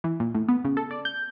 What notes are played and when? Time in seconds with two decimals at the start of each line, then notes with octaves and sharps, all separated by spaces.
0.04 E3
0.20 A#2
0.34 A2
0.48 B3
0.65 C#3
0.77 A4
0.91 D5
1.05 G6